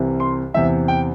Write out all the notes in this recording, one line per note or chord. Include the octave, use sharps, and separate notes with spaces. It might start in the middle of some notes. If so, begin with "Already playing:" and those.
Already playing: C2 C3 E3
C6
E2 C3 E3 E5
G5